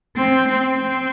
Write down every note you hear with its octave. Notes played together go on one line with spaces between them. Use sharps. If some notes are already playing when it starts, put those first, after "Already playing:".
C4
C4
C4